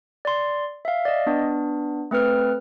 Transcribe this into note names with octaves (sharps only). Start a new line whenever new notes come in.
D5 C6
E5 F5
D5 D#5
B3 D4
A3 C4 B4 F6